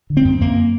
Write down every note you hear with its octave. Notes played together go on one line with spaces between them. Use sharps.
D3
C4
F#2
F#2 A#3